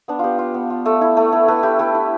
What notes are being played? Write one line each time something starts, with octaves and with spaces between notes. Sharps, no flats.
B3 D4
B3 F4 G4
F4
B3
F4
A3 A4
E4
A3
E4
A3 B4
E4 G4
A3 G4
E4